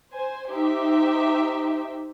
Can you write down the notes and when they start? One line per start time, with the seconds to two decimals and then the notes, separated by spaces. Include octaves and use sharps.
0.13 C5 G#5
0.50 D#4 G4 C5 E5